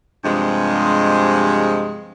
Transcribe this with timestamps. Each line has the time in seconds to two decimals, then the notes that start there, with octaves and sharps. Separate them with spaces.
0.24 G2 C3 F3 G#3